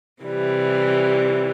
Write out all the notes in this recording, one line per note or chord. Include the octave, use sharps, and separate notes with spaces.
C3 E3 G3